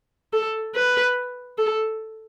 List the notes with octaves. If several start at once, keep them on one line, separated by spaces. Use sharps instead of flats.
A4
B4
A4